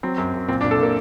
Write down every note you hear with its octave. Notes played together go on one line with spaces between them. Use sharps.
F#3 C4
F#2
F#2
A#2 C4
D4
A#2
A4
A#2 A#3